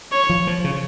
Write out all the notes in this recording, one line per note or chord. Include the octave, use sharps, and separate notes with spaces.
C#5
F3
F3
C#3